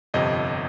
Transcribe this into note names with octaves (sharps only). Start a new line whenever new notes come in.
G1 F2 C3 D#5